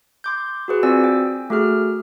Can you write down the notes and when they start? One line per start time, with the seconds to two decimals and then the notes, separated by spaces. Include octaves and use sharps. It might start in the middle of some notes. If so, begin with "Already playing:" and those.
0.24 C6 D6 G6
0.68 F#4 G#4 B4
0.83 C4 F4 F#4 D5 G#5 E6
1.04 G5
1.50 A3 F#4 G#4 F6